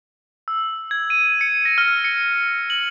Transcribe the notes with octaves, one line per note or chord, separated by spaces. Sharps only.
E6
G#6
D#7
C#7
A#6
F6
C#7
F#7